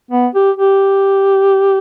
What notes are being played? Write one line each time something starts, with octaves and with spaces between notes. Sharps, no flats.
B3
G4
G4